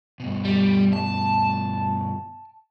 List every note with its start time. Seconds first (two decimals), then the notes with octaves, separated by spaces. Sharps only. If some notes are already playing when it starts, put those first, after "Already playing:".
0.20 G2 B2
0.45 G3
0.93 A5